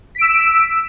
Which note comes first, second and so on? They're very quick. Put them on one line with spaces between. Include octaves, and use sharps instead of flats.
B6 D7 E6